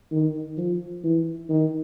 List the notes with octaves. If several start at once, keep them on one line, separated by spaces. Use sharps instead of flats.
D#3
F3
E3
D#3